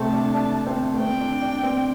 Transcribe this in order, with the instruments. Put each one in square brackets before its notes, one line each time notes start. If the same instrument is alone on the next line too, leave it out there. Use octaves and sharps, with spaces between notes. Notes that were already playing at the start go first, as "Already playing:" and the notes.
Already playing: [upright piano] C3 A3 C4 [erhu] A5
[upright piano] D4
D4
C4
A3
[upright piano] C4 [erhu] G5
[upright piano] D4
D4
C4